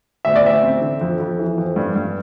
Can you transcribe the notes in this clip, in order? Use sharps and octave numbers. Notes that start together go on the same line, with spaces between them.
D2 E5
D5
D2 E5
C4
D3
F2
F2
E3
F2
G2
G2